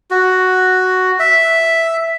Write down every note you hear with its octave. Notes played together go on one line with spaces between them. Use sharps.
F#4
E5